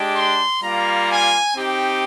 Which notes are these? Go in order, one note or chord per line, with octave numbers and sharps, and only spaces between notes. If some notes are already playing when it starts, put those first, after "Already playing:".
Already playing: G#3 D4 G4
C6
G3 A#3 F4 A#5
G#5
C4 D#4 G4